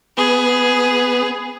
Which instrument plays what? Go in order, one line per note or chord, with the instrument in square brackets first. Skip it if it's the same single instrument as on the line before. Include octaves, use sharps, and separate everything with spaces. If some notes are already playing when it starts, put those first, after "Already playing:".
[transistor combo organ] B3 [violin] G#4